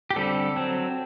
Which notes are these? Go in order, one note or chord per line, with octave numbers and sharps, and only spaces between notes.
G4
D3 G3 C4 A4
F#3 C4